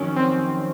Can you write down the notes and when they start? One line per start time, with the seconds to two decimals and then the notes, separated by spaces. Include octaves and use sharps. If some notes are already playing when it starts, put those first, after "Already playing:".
Already playing: F2 D#3 F#3 C#4
0.16 C4